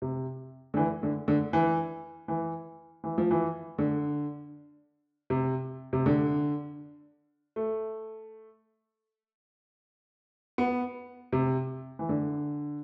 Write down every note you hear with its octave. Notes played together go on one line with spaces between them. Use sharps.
C3
D3
E3
D3
D3
E3
E3
E3
F3
E3
D3
C3
C3
D3
A3
B3
C3
E3
D3